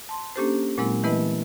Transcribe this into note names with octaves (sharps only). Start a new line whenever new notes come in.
A5 C6
A#3 C#4 D4 G4 A4 C5
A#2 F#3 G#3 A#3 C4 E4
E3 A3 B3 E4 B4 D#5